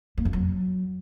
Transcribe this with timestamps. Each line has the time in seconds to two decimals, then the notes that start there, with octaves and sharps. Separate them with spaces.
0.18 A#3
0.25 F2
0.33 F#3